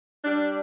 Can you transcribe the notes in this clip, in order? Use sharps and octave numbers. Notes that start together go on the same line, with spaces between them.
G3 D4